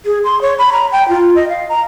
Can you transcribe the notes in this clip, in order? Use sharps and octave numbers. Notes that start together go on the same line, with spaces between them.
G#4
C6
C#5
B5
A#5
G5
F4
D#5
F5
A#5